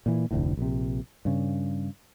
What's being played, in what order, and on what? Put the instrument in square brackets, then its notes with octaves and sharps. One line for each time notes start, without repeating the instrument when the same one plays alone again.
[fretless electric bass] A#2 E3
F1 D2 A2
A#1 C3
G2 C#3